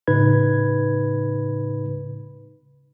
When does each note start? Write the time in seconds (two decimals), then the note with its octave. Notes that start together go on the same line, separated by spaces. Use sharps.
0.07 A2 C#3 D#4 B4 B5 G#6